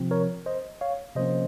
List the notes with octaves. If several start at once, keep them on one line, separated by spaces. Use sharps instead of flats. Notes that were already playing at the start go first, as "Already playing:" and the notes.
Already playing: C3 F3 C4
A#4 C#5
C5 D#5
C#5 F5
C3 F3 A#3 C#4 C5 D#5